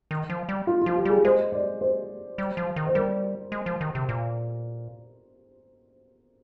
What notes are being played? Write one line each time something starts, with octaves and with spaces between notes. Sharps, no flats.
D#3
F3
G3
F4
F3 F4
G4
G3 G#4
G#3 C5
D5
C5
G3
F3
D#3
C5
G3 A#4
G#3
F3
D#3
C3
A#2